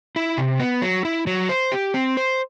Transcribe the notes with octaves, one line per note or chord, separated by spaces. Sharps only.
E4
C3
B3
F#3
E4
F#3
C5
G4
C4
C5